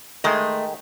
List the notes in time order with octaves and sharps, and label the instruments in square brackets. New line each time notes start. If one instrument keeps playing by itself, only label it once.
[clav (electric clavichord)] D#3 G#3 [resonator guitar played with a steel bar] A3 D#5